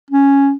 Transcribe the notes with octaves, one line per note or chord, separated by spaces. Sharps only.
C#4